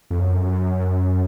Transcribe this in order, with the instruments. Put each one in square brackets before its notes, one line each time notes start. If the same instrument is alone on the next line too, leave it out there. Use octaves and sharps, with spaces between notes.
[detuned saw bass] F2
F#2